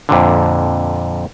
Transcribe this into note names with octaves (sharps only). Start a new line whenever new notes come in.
F2 A#2 D3